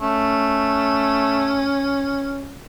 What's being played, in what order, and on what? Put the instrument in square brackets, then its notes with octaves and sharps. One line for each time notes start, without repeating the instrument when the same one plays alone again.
[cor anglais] A3 [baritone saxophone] C#4